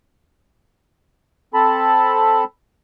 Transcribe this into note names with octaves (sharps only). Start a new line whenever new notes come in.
C4 A4 A5 B5